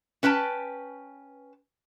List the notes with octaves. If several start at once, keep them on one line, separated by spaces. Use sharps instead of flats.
C#4 B4 G5 A5